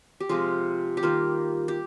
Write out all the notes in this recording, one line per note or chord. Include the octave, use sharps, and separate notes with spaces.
G4
C3 F3 G#3 F4
G4
D#3 G3 A#3 F4
G4